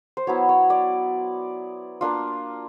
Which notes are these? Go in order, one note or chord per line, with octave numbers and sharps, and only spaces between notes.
C5
F#3 B3 E4 C#5
C#5
D5
A#3 D4 F4